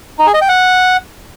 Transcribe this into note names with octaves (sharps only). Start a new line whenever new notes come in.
D#4
G#4
D#5
G5
F#5